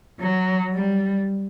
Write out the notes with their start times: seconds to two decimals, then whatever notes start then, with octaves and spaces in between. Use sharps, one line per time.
0.19 F#3
0.74 G3